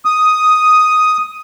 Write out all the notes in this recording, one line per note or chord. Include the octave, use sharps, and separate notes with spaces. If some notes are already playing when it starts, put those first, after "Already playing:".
D#6